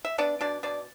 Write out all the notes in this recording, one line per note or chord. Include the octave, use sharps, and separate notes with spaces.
E5
B3 D4 D5
B2 D4 D5
B2 D4 D5